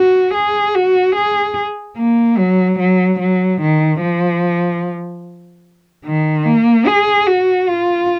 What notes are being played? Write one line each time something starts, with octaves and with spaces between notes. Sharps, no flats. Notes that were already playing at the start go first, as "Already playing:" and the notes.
Already playing: F#4
G#4
F#4
G#4
A#3
F#3
F#3
F#3
D#3
F3
D#3
A#3
G#4
F#4
F4